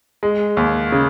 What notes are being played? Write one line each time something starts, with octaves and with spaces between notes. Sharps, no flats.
G#3
D#2
C#3